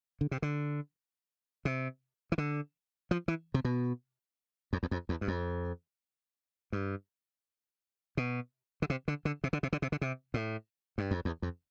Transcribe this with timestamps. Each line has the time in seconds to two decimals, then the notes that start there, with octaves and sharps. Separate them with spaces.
0.21 D3
0.31 C3
0.42 D3
1.65 C3
2.32 E3
2.38 D3
3.11 F3
3.28 E3
3.54 C3
3.65 B2
4.73 F2
4.83 E2
4.91 F2
5.09 E2
5.21 G2
5.28 F2
6.72 G2
8.17 B2
8.82 D3
8.90 C3
9.08 D3
9.25 D3
9.44 C3
9.53 D3
9.63 C3
9.73 D3
9.82 C3
9.92 D3
10.01 C3
10.34 A2
10.98 G2
11.11 F2
11.25 E2
11.42 F2